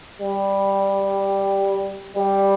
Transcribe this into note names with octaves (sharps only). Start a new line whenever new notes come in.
G3
G3